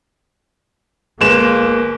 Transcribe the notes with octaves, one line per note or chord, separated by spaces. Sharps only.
G1 G#3 A#3 E7